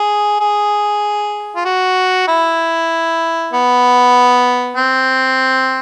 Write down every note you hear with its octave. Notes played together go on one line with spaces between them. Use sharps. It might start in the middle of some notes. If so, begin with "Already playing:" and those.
Already playing: G#4
G#4
F4
F#4
E4
B3
C4